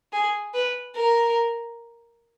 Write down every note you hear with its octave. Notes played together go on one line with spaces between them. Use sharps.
G#4
B4
A#4